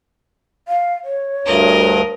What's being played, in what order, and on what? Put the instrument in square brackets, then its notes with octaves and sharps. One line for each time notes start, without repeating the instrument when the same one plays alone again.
[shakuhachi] F5
C#5
[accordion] D2 G2 [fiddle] A#4 D#5